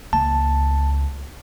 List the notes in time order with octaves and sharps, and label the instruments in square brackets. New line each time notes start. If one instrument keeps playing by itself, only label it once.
[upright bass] C#2 A#3 [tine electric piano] A5